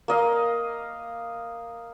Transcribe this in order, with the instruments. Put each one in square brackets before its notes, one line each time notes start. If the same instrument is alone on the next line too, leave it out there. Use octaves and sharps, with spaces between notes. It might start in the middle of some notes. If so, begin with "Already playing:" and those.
[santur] A#3 D#5 F5